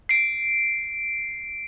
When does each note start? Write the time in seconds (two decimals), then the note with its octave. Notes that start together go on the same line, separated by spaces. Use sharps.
0.09 C7 D7